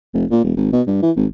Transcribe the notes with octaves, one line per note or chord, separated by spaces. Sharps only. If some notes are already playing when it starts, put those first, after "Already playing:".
F1
A#2
E1
G#1
B2
G2
E3
G#1